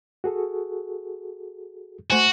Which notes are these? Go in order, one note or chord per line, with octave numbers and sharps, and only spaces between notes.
F#4 G#4 A4
A3 F#4 C5 G#5